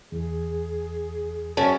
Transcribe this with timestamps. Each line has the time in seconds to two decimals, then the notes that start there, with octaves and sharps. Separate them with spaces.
0.12 E2 G#4
1.57 F#2 C#4 A5